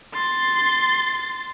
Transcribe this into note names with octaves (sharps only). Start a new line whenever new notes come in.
C6 A6